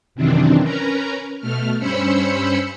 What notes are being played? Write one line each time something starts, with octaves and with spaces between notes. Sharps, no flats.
F#2 C3 D#3 E3 C4 D4
C#4 A#4 B4 A#5
B2 A3 F6
G2 C#4 C5 B5 E6 C#7